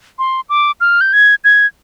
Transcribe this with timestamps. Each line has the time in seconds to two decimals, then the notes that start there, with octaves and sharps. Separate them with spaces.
0.19 C6
0.50 D6
0.81 F6
1.01 G6
1.13 G#6
1.44 G#6